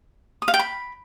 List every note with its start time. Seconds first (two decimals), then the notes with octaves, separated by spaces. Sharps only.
0.42 D#6
0.48 F5
0.54 G5
0.59 B5